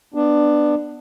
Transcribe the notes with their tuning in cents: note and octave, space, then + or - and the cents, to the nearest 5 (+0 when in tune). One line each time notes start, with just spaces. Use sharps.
B3 +5 D4 +15